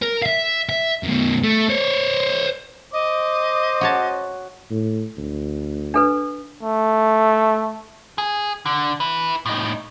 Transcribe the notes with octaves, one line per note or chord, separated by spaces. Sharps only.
A#4
E5 F5
E5
F#2 B2
A3
C5 C#5
C5 D#5 D6
F#4 C#5 A5
A2
D2
D4 A4 B4
A3
G#4
D3
E4 B4
A2 D#4